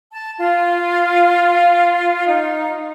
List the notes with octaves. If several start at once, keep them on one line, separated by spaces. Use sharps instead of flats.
A5
F4
D#4